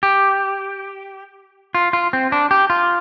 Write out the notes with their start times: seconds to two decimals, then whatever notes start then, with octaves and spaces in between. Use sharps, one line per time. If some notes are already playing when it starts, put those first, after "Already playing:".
0.03 G4
1.75 F4
1.93 F4
2.13 C4
2.32 D4
2.51 G4
2.70 F4